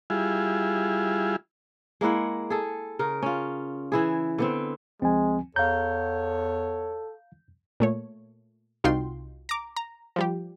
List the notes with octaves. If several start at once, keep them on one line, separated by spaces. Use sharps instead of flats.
G3 E4 F4 G#4
G#3 A#3 E4 F#5
G#4 A4
C#3 A#4
C#4 F4
E3 E4 G#4
D3 B3 C4
C#2 F3 G#3 C4 G#5
E2 A4 C#5 F5 A#5 G6
A#2 A3 C#5
C2 D#4 F4 F#4 G5 C6
A#5 D6
A#5
F3 G3 G4